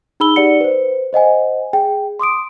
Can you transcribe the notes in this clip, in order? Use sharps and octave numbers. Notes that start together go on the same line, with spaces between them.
D#4 G#4 B5 E6 G7
D#4 G4 D5 F#5 C#7
B4 C5
C5 D#5 F#5 G#5
G#4 G5
C6 D6 D#6 D7